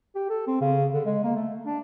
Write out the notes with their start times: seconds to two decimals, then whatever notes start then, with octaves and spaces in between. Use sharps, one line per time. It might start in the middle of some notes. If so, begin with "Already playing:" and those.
0.15 G4
0.29 A4
0.47 C4
0.61 C#3
0.93 D3
1.06 G#3
1.23 A#3
1.36 A3
1.66 D4